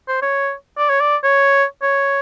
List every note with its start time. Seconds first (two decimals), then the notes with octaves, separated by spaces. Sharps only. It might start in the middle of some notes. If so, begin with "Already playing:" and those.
0.08 C5
0.22 C#5
0.78 D5
0.89 C#5
1.00 D5
1.24 C#5
1.82 C#5